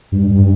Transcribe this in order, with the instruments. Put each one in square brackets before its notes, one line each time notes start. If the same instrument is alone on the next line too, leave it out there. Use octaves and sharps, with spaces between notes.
[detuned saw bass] G2
G2